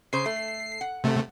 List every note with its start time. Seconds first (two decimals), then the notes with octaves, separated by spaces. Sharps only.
0.13 C#3 C5 C7
0.26 A3
0.81 F#5
1.04 C3 A3